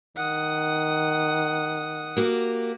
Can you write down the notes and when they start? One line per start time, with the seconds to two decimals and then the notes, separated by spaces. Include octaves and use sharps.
0.17 D#3 F#5 D#6
2.17 A#3 F#4 G4